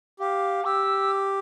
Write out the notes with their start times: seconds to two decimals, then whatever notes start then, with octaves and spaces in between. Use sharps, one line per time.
0.19 G4 F5
0.64 G4 E6